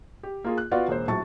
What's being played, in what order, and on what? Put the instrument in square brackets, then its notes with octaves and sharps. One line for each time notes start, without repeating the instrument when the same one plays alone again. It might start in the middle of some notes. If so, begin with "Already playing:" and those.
[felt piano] G4
A#3 F4 G#4
F#6
B3 F4 F#4 D5 F5 F#5
E1 A#3 C5
A#1 A2 F#3 A5 C#6 A6